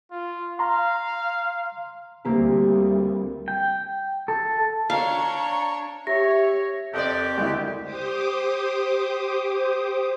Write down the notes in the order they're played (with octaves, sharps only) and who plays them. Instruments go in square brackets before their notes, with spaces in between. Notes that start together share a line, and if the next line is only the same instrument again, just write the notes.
[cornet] F4
[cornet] F5 [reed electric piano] A#5 C6
[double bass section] D2 G3 [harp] A#3 C4 G4
[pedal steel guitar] G5
A4
[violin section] D4 C#5 [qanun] F5 [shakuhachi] A#5
[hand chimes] G4 [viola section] C#5 [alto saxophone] E5 [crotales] A#6
[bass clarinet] F2 [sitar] C4 A#4 D5 [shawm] G4 [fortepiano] A4 D#5 F#6
[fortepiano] D2 E4 [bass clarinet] G#3
[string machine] G4 C5 D6 D#6